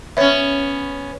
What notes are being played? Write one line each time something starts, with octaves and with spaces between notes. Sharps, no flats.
B3 C#4 C#5 E5